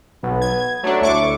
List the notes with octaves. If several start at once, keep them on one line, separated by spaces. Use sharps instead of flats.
B1 B3
G#6
F#3 A3 D4
D2 E4 C#6 D6